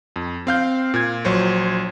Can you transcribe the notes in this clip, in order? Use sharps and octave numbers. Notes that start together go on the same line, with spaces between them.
F2
C4 F5 G6
A#2 G#6
A#1 F#3 C5 C#5